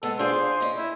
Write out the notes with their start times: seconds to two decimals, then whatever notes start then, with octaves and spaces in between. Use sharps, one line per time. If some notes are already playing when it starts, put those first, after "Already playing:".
0.03 G#3 B3 A4
0.19 D4 F4 G#4 C5
0.60 C#4 D#5
0.77 E4